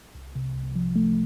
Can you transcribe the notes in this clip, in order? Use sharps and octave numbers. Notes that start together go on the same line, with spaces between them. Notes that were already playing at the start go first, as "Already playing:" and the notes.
C2
C3
C2
F3
A3